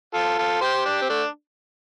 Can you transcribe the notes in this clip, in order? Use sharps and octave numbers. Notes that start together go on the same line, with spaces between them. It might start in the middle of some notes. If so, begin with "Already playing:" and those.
F4 A4
F4 A4
G4 C5
D4 G4
C4
A3 D4